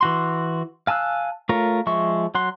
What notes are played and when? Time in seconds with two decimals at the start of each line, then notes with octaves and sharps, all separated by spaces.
0.01 E3 F#4 C6
0.87 F5 G#5 A5 E6 F#6
1.49 A3 F4 A#4 C#5
1.87 F3 G#3 E5 C#6
2.35 F#3 F#5 C6